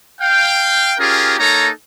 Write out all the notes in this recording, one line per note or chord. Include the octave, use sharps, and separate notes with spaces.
F5 G5
C#4 F4 G4 G#4 A#4
A#3 D#4 A4 C#5 A#5